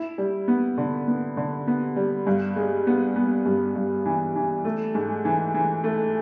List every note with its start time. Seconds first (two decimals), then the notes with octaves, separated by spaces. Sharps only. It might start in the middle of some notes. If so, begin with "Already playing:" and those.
Already playing: E4
0.18 G3
0.48 B3
0.78 D3
1.08 B3
1.37 D3
1.67 B3
1.96 G3
2.27 G2
2.56 G#3
2.87 B3
3.16 B3
3.46 G2
3.76 G2
4.05 E3
4.36 E3
4.65 A3
4.95 G#2
5.25 E3
5.54 E3
5.84 A3